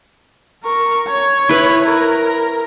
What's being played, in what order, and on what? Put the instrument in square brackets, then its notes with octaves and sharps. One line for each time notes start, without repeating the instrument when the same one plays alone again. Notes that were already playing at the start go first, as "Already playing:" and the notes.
[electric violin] A#4 C#6
C#5
[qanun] E4 B4
[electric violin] A#4